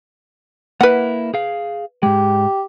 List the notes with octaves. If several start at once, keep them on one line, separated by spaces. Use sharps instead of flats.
A#3 E4 B4 F#5
G#4 F5
G#2 G#3 G4